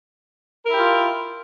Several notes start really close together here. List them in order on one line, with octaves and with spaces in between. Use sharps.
A#4 E4 G4 F4